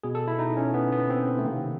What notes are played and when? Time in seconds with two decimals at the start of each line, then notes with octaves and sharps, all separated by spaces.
0.03 B2 G#4
0.15 A4
0.28 E4
0.39 D#4
0.57 C#4
0.74 B3
0.92 B3
1.10 C4
1.39 A3
1.45 C3 D#3 A#3